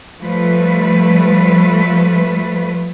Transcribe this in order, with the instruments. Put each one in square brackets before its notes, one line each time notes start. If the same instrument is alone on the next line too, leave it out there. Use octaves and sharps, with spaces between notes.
[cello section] F3 G3 A3 B4